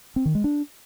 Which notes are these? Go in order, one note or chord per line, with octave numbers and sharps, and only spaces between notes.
C4
D#3
G#3
D4